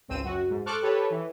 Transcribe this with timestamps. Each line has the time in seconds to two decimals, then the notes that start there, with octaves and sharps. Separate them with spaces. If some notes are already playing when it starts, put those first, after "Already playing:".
0.08 G#1 C#2 C4 E6 D#7
0.24 F#2 F#4
0.50 G#2
0.66 A4 C5 C#6 D6 F6 F#6
0.82 G4 A4 B4 C#5
1.10 E3